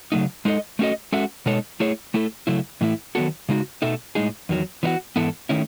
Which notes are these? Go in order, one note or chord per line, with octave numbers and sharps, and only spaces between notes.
C#3 F#3 A3 D#4
G#3 D#4 A4 D#5
A3 C#4 F#4 A4 D#5
G#3 C#4 F#4 A4 E5
B2 G#3 D#4 A4 C#5
A3 E4 G#4 C#5
A3 E4 A4
C#3 F#3 A3 E4
A2 E3 A3 E4
D#3 F#3 B3 F#4 A4
C#3 G#3 D#4 F#4
B2 A3 D#4 A4 E5
A2 G#3 D#4 G#4
E2 D#3 F#3
E3 B3 D#4 F#4
G#2 E3 B3 E4 A4
D#3 A3 C#4 E4